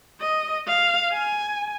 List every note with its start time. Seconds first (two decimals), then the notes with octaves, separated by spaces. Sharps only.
0.20 D#5
0.67 F5
1.12 G#5